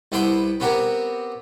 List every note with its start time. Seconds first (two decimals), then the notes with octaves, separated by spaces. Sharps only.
0.12 C2 B3 E4 C5 C6 D6
0.60 B3 C4 F#4 G4 A#4